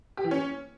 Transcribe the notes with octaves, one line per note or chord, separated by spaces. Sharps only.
G4
E3
C#4